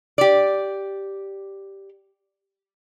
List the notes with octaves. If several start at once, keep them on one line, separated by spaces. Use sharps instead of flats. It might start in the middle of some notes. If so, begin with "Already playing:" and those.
G4 D5